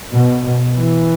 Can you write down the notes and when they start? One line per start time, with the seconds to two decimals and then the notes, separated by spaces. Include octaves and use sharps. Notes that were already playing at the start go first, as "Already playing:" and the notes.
0.13 B2
0.75 E3